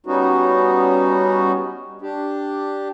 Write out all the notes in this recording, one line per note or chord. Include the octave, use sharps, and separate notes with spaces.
G3 B3 C#4 D#4 F#4
D4 G4